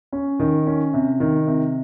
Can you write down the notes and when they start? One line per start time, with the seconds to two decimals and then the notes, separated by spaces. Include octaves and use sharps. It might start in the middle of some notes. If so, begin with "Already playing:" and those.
0.13 C#4
0.39 D#3
0.67 C#4
0.94 C3
1.20 D#3
1.47 C3